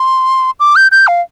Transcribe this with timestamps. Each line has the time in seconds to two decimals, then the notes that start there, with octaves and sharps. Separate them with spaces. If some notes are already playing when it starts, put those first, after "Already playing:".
Already playing: C6
0.60 D6
0.76 G6
0.92 G6
1.07 F5